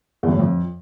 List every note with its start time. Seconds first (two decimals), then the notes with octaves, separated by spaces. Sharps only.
0.23 E2
0.29 F#2
0.34 A2
0.39 F2